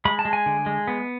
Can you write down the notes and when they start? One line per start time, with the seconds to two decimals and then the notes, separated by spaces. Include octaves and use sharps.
0.05 G#3 B5
0.19 A5
0.25 G#3
0.33 G#5
0.46 D3
0.66 G#3
0.88 B3